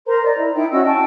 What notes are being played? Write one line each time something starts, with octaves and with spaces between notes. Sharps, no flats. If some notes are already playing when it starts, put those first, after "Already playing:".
A#4 C5 A#5
D5 D#5
E4
D#4 E4 G5
C#4 F#4 D#5 E6
G5 A5 C#6